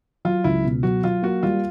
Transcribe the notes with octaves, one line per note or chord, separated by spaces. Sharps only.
F#3 F4
C#2 E4
B2
F#3 F#4
F#3 F4
A#3 F#4
G3 F4